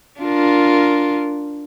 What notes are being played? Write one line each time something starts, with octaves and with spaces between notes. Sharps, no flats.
D4 F4 A#4